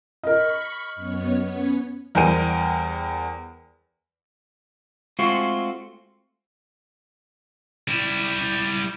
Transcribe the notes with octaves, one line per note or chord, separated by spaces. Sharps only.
A#4 D#5 B5 C#6
F#2 B3 C#5
B3 C#4 C#5
E2 G3 A#4 C5 G5 D#7
G#3 A3 C4 F4 F#4
G3 E4